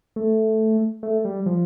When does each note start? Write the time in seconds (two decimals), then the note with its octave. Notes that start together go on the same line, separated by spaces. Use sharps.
0.16 A3
1.03 A3
1.25 G3
1.46 F3